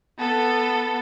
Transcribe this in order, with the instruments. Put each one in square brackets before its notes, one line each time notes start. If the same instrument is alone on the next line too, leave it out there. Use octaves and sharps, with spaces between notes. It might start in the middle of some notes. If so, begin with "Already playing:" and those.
[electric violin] B3 A4